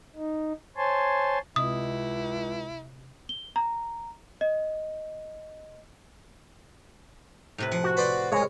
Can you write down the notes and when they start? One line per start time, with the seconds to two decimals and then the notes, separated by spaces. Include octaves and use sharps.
0.16 D#4
0.77 C5 C#5 G#5 A5 C6
1.56 C#2 C3 E4 D#5 D#6
3.29 G7
3.56 A#5
4.41 D#5
7.58 A2 C3 B4
7.72 F3 F#5
7.84 F#4
7.97 B4 C5 D5
8.32 G#3 A#4 C#5